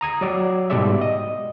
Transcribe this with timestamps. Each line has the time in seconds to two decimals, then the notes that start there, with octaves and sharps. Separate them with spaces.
0.01 A#5 D#6 G#6
0.21 F#3 D5 E6
0.70 G#2 B2 G3 D5 E5
1.01 D#5